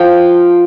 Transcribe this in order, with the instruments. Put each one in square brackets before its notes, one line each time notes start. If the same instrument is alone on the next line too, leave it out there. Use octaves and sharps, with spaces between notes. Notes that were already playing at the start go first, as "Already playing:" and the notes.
Already playing: [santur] F3 F5 G5